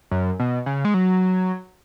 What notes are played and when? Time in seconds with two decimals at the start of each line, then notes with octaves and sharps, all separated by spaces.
0.11 F#2
0.40 B2
0.66 C#3
0.85 G#3
0.94 F#3